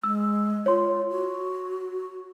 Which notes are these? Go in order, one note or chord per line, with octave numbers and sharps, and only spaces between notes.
G#3 E6
F4 C#5 C6
F#4